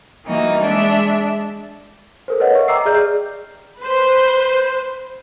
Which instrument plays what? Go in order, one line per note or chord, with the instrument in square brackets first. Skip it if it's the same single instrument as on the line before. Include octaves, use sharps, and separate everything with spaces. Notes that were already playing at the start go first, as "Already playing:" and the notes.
[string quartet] E3 G3 A#3 D#4 F#4
G#3 D4 E5
[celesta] A4 A#4 C5
B4 C#5 D#5 F#5
E5 C#6
D#5 G5 A#5 D6 E6 C7
G#4 D5 E5 F6 G6
[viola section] B4 C5